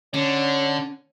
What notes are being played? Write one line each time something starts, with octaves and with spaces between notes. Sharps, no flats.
D3 C#4 C#5